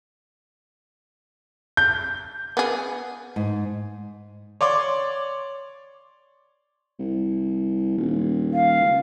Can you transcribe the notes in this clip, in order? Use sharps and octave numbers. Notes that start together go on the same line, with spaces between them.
G6
B3 G#4
G#2
C#5 D5 C6 D6
C2
D#1
F5
C#2